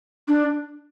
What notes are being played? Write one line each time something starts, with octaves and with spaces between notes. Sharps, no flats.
D4